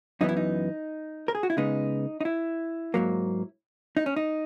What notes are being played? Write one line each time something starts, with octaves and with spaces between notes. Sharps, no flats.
F#2 E3 B3 D#4
E4
D#4
A#4
G#4
F#4
E4
C#3 G#3 B3 D#4
D#4
E4
G#2 F#3 A#3
D#4
C#4
D#4